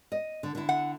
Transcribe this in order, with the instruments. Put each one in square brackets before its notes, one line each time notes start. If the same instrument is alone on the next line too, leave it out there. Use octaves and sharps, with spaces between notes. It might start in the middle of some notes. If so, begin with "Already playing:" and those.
[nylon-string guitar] D#5
D3
D3 E4
[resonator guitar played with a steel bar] F#5